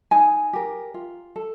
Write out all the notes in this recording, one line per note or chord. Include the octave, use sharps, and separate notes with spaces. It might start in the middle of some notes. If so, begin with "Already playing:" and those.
D#4 G#5
G4 A#4
F4
A4